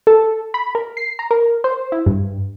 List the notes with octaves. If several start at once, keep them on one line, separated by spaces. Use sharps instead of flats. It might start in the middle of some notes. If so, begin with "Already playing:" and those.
A4
B5
A#4
C7
A#5
A#4
C5
E4
G2